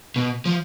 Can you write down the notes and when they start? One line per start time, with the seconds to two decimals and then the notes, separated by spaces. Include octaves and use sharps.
0.16 B2
0.45 F3